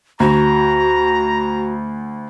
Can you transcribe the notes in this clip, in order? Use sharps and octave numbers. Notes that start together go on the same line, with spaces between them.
D2 F#4 A#5